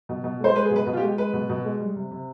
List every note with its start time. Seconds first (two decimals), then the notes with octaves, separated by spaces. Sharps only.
0.09 B2
0.24 B2
0.40 G#3 C5
0.55 G#3 B4
0.65 G#4
0.71 B2
0.76 B4
0.87 B2
0.93 F4
0.97 G4
1.02 G#3
1.17 G#3 B4
1.33 B2
1.49 B2
1.65 G#3
1.80 G3
1.96 C3
2.11 C3